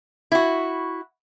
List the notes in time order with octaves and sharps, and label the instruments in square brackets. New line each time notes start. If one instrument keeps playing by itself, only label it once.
[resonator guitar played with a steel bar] E4 F#4